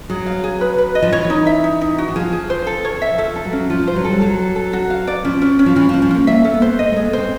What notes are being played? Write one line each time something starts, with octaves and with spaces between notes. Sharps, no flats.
F#3 G#4
F5
G#4
B4
B4
D#5
F3
E3 C#5
D#4
E5
D#4
D#4
F#4
E3
F3 G#4
G#4
C5
A4
C#5
E5
F3 A4
A4
F#3
C#4
F3 F4
F3 C5
F#3
G3 A4
F#3 A4
A4
A4
F#4
F5
D5
F3 C#4
C#4
C#4
F3
E3 C#4
F3
C#4
F3
A#3 C#4
A#3 E5
A4
B3
C5
A#3 D#5
A3 G#4
B3
C4 C5